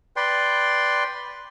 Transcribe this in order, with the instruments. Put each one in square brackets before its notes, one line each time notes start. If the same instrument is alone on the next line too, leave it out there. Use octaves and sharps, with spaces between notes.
[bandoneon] B4 D5 G5 C6